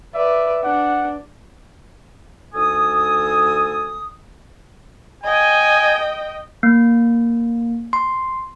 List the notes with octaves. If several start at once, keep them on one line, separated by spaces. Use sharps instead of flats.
B4 D5 E5
D4 F#5
D2 D#4 A4 G#5 D#6
D#5 G5 G#5
A#3
C6